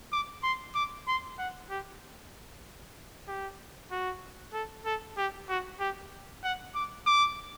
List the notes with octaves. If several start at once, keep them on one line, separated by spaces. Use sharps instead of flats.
D6
C6
D6
C6
F#5
G4
G4
F#4
A4
A4
G4
F#4
G4
F#5
D6
D6